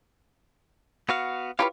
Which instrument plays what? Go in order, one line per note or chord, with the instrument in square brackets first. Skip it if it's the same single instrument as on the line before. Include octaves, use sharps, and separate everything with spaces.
[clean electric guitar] B3 F#4 F5
[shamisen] E4 F4 B4 [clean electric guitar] G4 C#5 F5